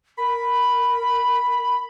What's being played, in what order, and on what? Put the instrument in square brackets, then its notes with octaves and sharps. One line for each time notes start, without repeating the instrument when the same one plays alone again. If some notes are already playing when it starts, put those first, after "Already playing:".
[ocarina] A#4 [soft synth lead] B5